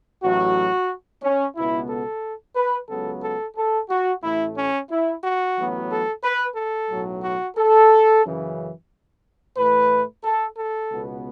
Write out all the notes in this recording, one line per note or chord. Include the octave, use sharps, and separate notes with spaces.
A1 A2 F#3 F#4
C#4
C#2 B2 B3 E4
A4
B4
C#2 C#3 F#3 B3 A4
A4
A4
F#4
A1 A2 A3 E4
C#4
E4
F#4
A1 A2 F#3 B3
A4
B4
A4
B1 A2 F#3
F#4
A4
F#2 C#3 E3
A2 E3 A3 B4
A4
A4
C#2 B2 B3